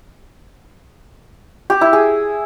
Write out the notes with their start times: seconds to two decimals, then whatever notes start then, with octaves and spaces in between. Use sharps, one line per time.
1.70 G4
1.81 E4
1.93 G#4